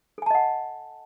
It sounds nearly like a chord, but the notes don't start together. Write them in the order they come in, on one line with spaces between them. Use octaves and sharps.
A4 G#5 A5 D#5 F#5